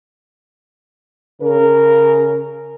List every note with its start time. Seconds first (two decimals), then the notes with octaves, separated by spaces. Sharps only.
1.41 C#3 A#4